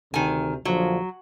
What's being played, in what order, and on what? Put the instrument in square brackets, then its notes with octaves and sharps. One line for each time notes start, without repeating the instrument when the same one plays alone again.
[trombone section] D2 C3 [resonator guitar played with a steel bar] D#3 G#5
[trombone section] A#1 D3 F3 [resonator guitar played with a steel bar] F#3